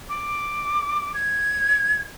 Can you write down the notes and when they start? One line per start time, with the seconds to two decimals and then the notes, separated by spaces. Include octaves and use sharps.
0.09 D6
1.14 G#6